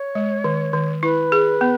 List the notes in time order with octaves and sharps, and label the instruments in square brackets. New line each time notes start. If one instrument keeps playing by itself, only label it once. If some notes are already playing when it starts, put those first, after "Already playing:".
Already playing: [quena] C#5
[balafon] G#3
D#3
D#3
[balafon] E4 [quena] B4
[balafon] G#4
B3